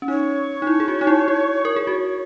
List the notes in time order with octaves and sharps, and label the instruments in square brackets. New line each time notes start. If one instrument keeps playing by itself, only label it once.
[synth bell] C#4
[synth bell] D#4 [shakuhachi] C#5
[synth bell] D#4
E4
G#4
F#4
D#4
E4
E4
A#4
G#4
F#4